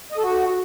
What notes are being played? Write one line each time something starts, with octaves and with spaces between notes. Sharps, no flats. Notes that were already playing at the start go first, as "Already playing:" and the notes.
D#5
A4
F#4